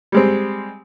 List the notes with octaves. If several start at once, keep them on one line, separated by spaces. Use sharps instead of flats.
G3 G#3 C4